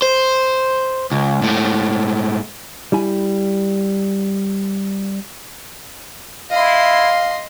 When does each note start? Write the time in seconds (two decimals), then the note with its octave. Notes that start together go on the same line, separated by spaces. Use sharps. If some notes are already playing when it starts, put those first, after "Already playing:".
0.02 C5
1.12 C#2
1.42 G#2 A3
2.92 G3 E4 G#5
6.51 E4 D#5 F5 C6